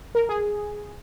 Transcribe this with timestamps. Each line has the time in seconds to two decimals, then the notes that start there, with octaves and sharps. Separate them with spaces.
0.15 A#4
0.29 G#4